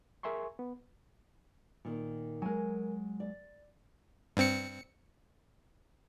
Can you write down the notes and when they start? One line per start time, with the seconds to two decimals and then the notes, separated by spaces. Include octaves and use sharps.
0.23 G#4 A#4 E5 G#5 C6 C#6
0.59 B3
1.85 A#2 D#3
2.42 F#3 G#3 A#4 G#5
3.20 D5
4.37 G2 C4 C#7